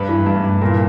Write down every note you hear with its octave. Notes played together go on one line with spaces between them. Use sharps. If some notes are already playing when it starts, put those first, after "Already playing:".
Already playing: G2 B4
E3
G2
G2
A#2 A#4